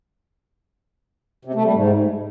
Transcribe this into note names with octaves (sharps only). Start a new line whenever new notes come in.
C3
A3
G3
G#2